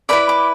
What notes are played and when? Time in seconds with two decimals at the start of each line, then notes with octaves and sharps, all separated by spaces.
0.09 E4 B4 D5 B5
0.29 D6